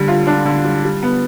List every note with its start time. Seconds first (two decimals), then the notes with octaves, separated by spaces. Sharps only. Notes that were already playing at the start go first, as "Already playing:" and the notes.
Already playing: D3 G3
0.08 F4
0.27 D4
0.45 D3
0.65 G3
0.84 G3
1.03 B3